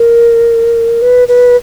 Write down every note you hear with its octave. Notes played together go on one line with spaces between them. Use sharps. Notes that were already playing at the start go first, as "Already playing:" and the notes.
Already playing: A#4
B4
B4